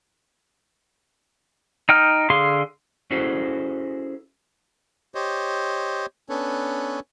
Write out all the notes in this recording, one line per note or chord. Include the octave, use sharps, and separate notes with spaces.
D#4 G5 F6
D3 G#4 F5 C6
C#4 E4 F#4 G#4 A4 C5
G4 C5 C#5 D#5
B3 C#4 D4 A4 B4 C#5